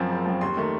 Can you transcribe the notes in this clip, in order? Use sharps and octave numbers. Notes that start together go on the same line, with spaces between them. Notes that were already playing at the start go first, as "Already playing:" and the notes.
Already playing: F#2 F3 C4
F#1
F#2 F3 C4
D#2 C6
D#3 A3